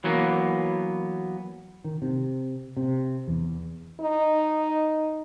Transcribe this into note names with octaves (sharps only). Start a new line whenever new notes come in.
E3 F#3 A#3 B3
D#3
C3
C3
E2
D#4